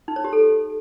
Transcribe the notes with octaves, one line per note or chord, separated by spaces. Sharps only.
D#4
C#5
G4
A4